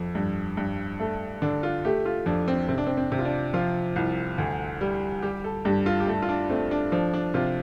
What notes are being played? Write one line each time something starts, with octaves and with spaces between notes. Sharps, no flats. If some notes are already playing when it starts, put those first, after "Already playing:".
Already playing: F2
G2
G2
A3 A4
D3 D4
F4
A3 G4
F4
F2 D4
C4
C3 C4
D4
C4
C4
C3
F4
D4
F3 F4
C2
D2
G3
G3 G4
A4
G2 G4
F4
G4
A3 A4
F4
D4
A3 C4
D4
F3 D4
D4
C3 F4